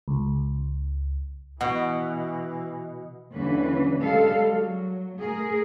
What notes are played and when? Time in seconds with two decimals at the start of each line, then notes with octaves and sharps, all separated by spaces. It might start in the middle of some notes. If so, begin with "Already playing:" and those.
0.08 C#2
1.61 B2 E3 F#5 C#6
3.33 D#2 D3 E3 G3 C#4 B4
3.98 G3 G#3 A4 F5
4.49 F#3
5.18 A3 G#4 A#4